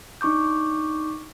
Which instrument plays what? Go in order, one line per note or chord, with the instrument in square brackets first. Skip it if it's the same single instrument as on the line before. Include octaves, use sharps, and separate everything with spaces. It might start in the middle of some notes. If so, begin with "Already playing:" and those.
[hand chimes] D4 D#4 C#6 D6 G6